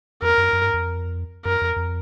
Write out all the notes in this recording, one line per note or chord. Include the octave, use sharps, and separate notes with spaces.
F2 A#4
F#2
F#2
G2
F2
F#2 A#4
F2
F2